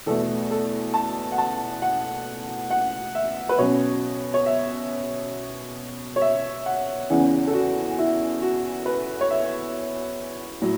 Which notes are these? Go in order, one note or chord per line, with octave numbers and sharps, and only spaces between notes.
E2 B2 A3 A4
A4
A5
F#5
A5
F#5
F#5
E5
B4
B2 F#3 C#4 C#5
C#5
E5
C#5
E5
F#5
E2 C#3 E3 C#4 F#5
A4
F#4
E4
F#4
B4
C#5
E5
A2 F#3